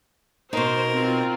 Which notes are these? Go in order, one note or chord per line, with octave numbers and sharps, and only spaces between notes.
B2 D#4 A#4 C5
C4 F4